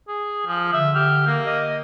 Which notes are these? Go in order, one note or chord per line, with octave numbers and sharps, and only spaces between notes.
G#4
F3
D3 E5
G4 F6
A#3
D#5